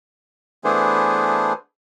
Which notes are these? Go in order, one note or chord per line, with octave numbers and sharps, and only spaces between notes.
E3 A3 B3 D4 G#4 C5